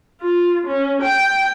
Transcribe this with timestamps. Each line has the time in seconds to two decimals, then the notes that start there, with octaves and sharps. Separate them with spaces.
0.21 F4
0.67 C#4
1.03 G5